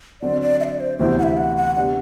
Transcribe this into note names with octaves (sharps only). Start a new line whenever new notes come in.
D3 F#3 C4 D5
D5
E5
D5
C5
D2 C3 E3 B3 E4 C5
F#5
E5
F#5
F#5
C3 G3 B3 D4 G4 F#5